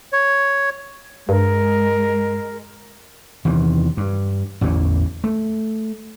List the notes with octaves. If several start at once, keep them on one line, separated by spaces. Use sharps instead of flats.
C#5
G2 G#3 A#4
E2 C3 D#3 E3
G2
A1 E2 A2 D3
A3